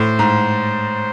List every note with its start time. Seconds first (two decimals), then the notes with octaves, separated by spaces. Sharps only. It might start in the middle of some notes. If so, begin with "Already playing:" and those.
Already playing: A2 C5
0.19 G#2